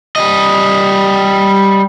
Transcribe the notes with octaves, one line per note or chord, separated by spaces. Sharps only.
G3 D#5